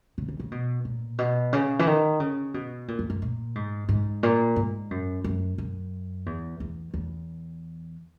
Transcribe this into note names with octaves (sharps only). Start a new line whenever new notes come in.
C#3
C#3
C#3
B2
A#2
B2
C#3
E3
D#3
C#3
B2
A#2
F#2
F#2
A#2
G#2
G#2
A#2
G#2
F#2
F#2
F#2
E2
E2
E2